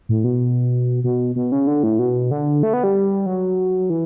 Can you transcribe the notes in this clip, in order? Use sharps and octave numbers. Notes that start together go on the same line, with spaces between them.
A2
B2
B2
B2
C#3
D3
A2
B2
D3
A3
B3
G3
F#3
E3